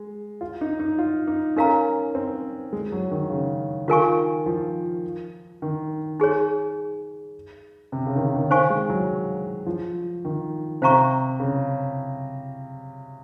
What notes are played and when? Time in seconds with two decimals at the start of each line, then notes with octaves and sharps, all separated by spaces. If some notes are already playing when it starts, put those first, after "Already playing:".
Already playing: G#3
0.41 F4
0.61 D#4
0.80 D#4
0.98 F4
1.27 D#4
1.56 C#4 D#4 A#4 F5 A#5
2.15 C4
2.73 G#3
2.92 F#3
3.11 D#3
3.30 C#3
3.88 D#3 F4 A#4 F5 G#5 C#6
4.46 F3
5.62 D#3
6.20 D#4 G#4 C#5
7.92 C3
8.07 C#3
8.16 D#3
8.22 C#3
8.36 D#3
8.51 D#3 C5 F5 G#5 C#6
8.70 G#3
8.90 F#3
9.66 F3
10.25 D#3
10.82 C3 C5 F5 A#5 C#6
11.40 C#3